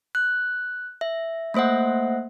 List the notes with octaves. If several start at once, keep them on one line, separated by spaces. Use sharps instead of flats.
F#6
E5
A3 A#3 C5 E5 F#5